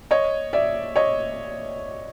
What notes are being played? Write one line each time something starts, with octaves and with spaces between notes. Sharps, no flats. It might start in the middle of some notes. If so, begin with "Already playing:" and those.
C#5 D#5
D5 E5
C#5 D#5